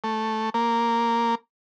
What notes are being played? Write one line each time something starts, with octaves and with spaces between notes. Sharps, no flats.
A3
A#3